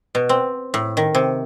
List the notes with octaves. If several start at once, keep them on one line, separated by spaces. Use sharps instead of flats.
B2
C4
A2
D#3
C3